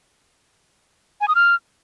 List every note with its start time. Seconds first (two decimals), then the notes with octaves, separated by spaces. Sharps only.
1.21 G#5
1.28 D#6
1.35 F6